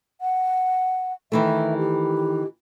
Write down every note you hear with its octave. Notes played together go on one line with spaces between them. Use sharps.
F#5
D#3 E3 A3 E5
G4